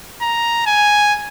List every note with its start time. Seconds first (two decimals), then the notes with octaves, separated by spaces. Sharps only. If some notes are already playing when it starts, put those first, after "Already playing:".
0.22 A#5
0.67 G#5